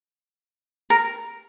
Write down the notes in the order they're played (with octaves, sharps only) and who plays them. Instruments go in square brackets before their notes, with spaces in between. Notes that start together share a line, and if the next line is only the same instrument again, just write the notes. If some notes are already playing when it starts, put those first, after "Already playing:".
[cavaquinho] A#4